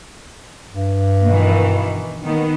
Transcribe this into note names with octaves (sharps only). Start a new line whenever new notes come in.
G2
B2 D#3 E3
D#3 B3